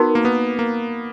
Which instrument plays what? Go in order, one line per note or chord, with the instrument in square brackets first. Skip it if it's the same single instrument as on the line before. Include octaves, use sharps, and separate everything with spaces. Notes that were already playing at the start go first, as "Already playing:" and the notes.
Already playing: [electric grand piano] B3 [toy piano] D#4 F#4 A#4
[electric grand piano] A#3
B3
A#3